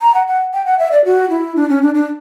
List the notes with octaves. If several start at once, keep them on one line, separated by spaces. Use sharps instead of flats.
A#5
F#5
F#5
G5
F#5
E5
D5
F#4
E4
D4
C#4
D4
D4